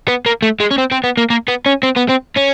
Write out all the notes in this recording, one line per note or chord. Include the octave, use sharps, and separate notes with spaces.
B3
A#3
A3
G#3
C#4
C4
C4
B3
A#3
A#3
B3
C#4
C4
B3
C4
C#4